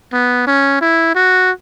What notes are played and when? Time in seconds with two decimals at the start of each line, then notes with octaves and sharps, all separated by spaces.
0.13 B3
0.47 C#4
0.81 E4
1.15 F#4